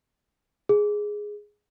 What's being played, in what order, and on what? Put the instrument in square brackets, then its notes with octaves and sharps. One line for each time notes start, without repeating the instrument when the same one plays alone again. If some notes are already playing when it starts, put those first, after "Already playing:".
[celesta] G#4